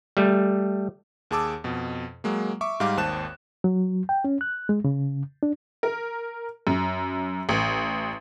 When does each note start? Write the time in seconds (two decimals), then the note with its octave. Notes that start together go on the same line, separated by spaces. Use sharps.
0.17 G3 A3
1.31 D#2 G#4 A5 D6 E6
1.64 F2 B2
2.24 F#3 G#3 A#3
2.61 E5 C#6 D6
2.80 G#2 G3 F5 D6
2.97 G#1 D#2 C5 A5 F#6 E7
3.64 F#3
4.09 G5
4.24 C#4
4.41 F#6
4.69 G#3
4.85 C#3
5.43 D4
5.83 A#4
6.67 F#2
7.49 A1